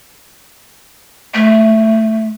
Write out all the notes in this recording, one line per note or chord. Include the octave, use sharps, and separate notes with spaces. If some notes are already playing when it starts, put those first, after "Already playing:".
A3